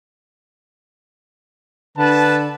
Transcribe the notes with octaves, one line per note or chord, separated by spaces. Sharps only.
D3 B4 A5